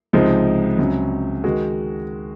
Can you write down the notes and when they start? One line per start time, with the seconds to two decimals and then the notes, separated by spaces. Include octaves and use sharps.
0.13 C#2 C3 F3 G#3 D#4
0.78 C#2 C3 F#3 C#4
1.44 D#3 G#3 F#4